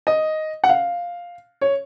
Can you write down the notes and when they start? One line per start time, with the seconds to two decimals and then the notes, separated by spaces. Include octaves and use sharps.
0.07 D#5
0.64 F#5
0.69 F5
1.61 C#5